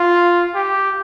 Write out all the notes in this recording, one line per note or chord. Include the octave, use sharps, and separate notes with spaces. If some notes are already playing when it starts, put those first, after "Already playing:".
Already playing: F4
G4